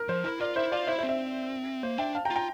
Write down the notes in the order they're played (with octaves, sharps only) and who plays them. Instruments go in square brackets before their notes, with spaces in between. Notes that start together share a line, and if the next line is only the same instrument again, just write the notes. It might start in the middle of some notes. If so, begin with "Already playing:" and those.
Already playing: [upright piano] A#4
[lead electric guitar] F3 [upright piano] C5
[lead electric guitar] E4 [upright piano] A#4
[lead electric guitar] F4 [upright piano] A#4 D5
[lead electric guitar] E4 [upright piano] C5 E5
[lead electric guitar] F4 [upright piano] D5 F5
[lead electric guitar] E4 [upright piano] C5 E5
[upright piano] C5 E5
[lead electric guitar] C4
[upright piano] C5 E5
[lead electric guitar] A#3 [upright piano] C5
[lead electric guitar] D4 [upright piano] E5 G5
[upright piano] F5 A5
G5 A#5
[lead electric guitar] F4
[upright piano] G5 A#5